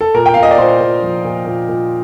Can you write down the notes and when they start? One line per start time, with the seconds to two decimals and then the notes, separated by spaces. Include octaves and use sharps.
0.01 A4
0.14 A#2 A#4
0.26 G5
0.34 A#2 F5
0.43 D#5
0.51 D5
0.58 A#2 C5
0.81 A#2
1.03 F3
1.25 A#2
1.46 A#2
1.69 A#2